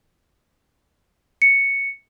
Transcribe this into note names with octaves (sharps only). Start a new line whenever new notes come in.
C#7